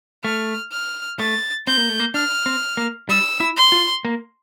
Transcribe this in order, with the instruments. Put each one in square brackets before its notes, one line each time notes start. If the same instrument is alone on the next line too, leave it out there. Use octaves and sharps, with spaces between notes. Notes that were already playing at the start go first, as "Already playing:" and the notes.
[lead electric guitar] A3 [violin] F6
[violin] F6
[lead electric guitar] A3 [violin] A6
[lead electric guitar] C4 [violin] G6
[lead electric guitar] A#3
A3
A#3
[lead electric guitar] D4 [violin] F6
[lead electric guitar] C4
A#3
[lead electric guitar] G3 [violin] E6
[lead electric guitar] E4
[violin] C6
[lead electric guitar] F4
A#3